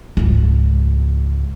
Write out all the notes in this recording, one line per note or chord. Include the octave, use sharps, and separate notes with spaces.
C#2 G#2